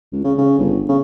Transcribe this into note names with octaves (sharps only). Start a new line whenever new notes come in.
C#2
C#3
C#3
G1
C#3